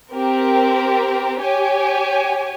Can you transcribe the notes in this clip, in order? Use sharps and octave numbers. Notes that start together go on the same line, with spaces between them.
C4 G4 A#4
G4 C#5 G#5